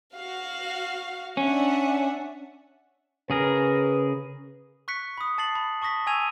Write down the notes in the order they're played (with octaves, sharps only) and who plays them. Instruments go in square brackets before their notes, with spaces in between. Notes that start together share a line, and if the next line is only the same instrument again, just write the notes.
[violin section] F#4 F5
[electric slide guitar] C#4 [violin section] D4 E5 F#5
[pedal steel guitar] C#3 G#4 A#4 [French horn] B4
[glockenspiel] C#6 F#6 B6 C#7
B5 D#6
A5 A6 C7 F#7
B5
A5 C#6 D#6 A#6 B6
G#5 C#6 E6 G#6 D#7 F7